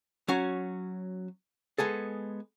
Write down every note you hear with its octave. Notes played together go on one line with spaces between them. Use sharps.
F#3 C#4 F#4
G#3 B3 G#4 A4